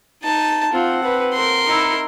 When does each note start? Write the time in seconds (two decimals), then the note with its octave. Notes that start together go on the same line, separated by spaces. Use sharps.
0.23 D#4 A5
0.72 C4 F4 F#5
1.03 B4
1.34 A#4 C6
1.65 D#4 E4